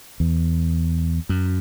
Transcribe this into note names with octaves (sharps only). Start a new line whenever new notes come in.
E2
F#2